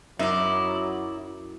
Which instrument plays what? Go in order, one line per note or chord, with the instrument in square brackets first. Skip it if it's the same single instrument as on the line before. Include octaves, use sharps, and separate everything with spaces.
[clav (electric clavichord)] F#2 [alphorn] F#3 [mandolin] D#4 D5 [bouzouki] E4